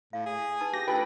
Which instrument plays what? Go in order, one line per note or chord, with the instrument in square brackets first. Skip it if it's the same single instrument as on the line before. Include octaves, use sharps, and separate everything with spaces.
[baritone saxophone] A2 [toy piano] F5
[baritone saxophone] G#4
[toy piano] D#4 B4 A5
[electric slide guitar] G4 [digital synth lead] A#6
[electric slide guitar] A3 A4 G5 [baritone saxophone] D4 [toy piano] F4 [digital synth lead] B4